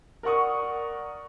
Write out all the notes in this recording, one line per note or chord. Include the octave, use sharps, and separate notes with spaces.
A#4 D5 F#5 C#6 D#6